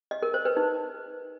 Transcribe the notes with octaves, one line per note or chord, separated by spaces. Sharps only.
D#5
A#4
C5
B4
D#4